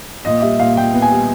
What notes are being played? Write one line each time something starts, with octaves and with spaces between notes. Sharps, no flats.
A#2 D#5
G3 E5
A#2 F5
A#2 G5
B3
G#5
G3